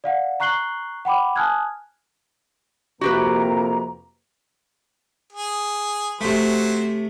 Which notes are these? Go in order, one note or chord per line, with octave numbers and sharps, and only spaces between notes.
D5 F5 F#5
A#5 C#6 F#6 C7 F#7 G7
F#5 G5 B5 D6
G#5 A5 D#6 F6 F#6 G#6
F2 C3 A#3 F#4 G4 B4 A#5
G#4
C3 F#3 A3 C5